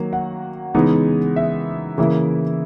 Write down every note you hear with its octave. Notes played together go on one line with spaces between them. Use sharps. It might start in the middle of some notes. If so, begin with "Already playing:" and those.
Already playing: D#3 F#3 A#3
F#5
C#3 E3 G#3 B3 D#4
E5
C#3 E3 A#3 E4